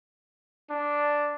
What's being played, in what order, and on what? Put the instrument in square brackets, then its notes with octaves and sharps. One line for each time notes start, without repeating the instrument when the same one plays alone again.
[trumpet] D4